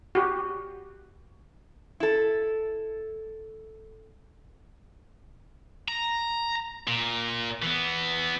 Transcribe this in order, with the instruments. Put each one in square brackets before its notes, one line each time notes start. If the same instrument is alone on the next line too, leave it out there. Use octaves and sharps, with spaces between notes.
[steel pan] F#4 G4
[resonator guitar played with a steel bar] E4 A4
[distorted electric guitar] A#5
A#2
E3 B3